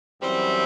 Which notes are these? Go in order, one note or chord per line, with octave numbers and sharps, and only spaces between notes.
F#2 E3 G3 C4